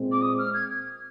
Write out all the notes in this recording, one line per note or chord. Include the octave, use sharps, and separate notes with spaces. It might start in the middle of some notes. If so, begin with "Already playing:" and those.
Already playing: A#2 G#3 C4
D6
D#6
F6
G#6